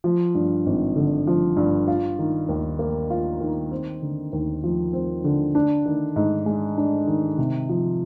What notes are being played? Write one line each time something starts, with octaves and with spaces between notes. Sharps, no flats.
F3
G2
G#1
D3
F3
G2
F4
D#3
D#2
A#3
F4
D#3
C4
D3
D#2
F3
C4
D3
D4
D#3
G#2
G#3
D4
D#3
C3
F3